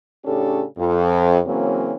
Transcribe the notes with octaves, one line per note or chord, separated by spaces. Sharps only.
A2 C#3 C#4 D4 G4 A4
F2
C#3 E3 F#3 A#3 C4 C#4